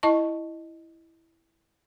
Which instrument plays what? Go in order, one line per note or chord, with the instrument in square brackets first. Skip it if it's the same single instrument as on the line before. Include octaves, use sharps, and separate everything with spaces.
[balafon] E4 D#5 A5 C#6